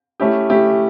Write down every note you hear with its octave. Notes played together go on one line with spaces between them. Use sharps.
A3 C#4 E4 G4
A3 C#4 E4 G4